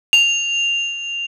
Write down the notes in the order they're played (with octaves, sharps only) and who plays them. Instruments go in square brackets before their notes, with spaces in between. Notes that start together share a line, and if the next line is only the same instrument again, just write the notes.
[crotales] F7